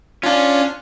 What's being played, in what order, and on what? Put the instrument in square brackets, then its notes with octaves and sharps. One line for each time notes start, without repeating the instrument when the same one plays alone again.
[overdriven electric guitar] C#4 [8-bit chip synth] D4 F4